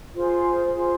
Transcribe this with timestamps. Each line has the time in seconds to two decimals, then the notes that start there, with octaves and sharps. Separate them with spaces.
0.15 F4 G#4 C5
0.75 F4 G#4 C5